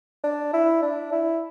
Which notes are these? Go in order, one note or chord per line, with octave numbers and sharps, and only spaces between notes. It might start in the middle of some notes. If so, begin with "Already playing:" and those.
D4
E4
D4
E4